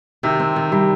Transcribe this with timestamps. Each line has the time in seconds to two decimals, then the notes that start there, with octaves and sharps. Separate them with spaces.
0.23 C3 D#3
0.40 C4
0.56 D#3
0.72 C3 G3